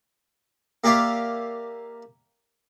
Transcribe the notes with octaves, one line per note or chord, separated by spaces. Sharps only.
A#3 G4 D5 E5 F5